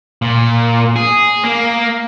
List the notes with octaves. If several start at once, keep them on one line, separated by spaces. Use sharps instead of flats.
A#2
G#4
A#3